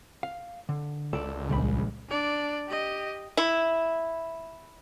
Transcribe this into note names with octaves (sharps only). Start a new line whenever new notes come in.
F5
D3
C#2 A4 D5
A#1 C#3 G3 G#3 B5
D4 D5
G4 D#5
E4